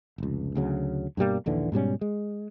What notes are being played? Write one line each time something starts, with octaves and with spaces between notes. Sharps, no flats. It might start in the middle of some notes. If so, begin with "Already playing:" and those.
F1 C#2
D2 C#3 F#3
G2 B2 G3 A#3
A#1 D#2 D3 E3
G#2 B2 G3 C#4
G#3